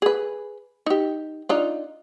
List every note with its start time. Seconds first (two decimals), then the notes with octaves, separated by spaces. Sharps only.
0.02 G#4 B4
0.86 D#4 G4
1.49 D4 D#4 F4